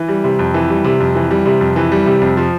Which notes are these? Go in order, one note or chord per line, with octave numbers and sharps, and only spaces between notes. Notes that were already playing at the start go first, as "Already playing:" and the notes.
Already playing: E3
G3
C3
F2
E3
G3
C3
F2
E3
G3
C3
F2
E3
G3
C3
F2
F3